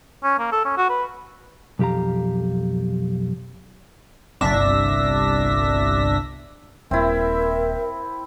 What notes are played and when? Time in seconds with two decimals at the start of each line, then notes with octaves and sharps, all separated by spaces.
0.23 C#4
0.39 A#3
0.52 A4
0.65 C#4
0.77 F#4
0.89 B4
1.79 B1 F2 G4 F5 A#5
4.41 G1 C2 D4 E5 A#6 B6
6.91 D#1 C4 E4 A#4 E5